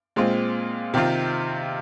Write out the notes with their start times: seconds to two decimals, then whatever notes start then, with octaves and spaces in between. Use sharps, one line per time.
0.16 A#2 G#3 C4 F4
0.94 C3 D#3 C4 F4